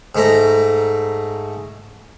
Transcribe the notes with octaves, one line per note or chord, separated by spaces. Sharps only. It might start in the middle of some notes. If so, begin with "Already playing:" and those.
G#2 A3 A#5